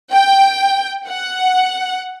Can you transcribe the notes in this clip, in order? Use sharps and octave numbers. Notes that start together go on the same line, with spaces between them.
G5
F#5